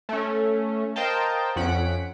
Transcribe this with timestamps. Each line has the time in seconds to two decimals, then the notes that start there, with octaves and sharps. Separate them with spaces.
0.09 A3 C#4
0.96 A#4 C5 D#5 F5 G5 A5
1.56 F2 C#4 F#5 B6 D7